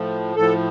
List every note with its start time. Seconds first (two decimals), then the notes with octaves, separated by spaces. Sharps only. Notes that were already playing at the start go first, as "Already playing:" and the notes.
Already playing: A2 F3
0.36 A2 F3 A4